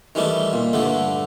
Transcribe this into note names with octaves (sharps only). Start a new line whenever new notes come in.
D#3 E3 G3 A3
A#2
G2 D3 A3